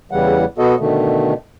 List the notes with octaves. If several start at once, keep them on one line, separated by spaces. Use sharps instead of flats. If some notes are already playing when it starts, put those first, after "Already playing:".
E2 C#3 E3 G3 F#5
B2 B3 F#4 A4 D#5
B2 D3 D#3 A3